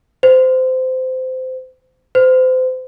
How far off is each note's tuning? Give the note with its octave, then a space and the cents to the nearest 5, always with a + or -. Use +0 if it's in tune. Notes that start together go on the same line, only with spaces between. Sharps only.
C5 -20
C5 -30